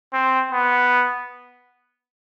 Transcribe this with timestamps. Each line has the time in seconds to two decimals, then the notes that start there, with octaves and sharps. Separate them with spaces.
0.13 C4
0.52 B3